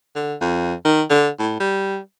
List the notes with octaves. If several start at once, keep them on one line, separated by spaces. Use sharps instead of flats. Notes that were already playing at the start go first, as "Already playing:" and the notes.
D3
F2
D#3
D3
A2
G3